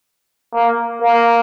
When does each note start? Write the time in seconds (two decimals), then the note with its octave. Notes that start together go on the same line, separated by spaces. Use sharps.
0.54 A#3
1.01 A#3